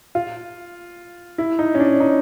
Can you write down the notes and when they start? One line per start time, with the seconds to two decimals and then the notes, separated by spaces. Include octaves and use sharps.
0.15 F4
1.38 E4
1.59 D#4
1.75 C#4
1.80 D4
2.00 D#4